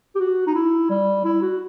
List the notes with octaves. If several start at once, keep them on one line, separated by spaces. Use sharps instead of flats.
G4
F#4
D#4
E4
G3
E4
F#4